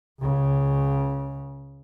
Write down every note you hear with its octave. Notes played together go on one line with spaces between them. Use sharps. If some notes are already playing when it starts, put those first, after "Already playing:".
C#2 C#3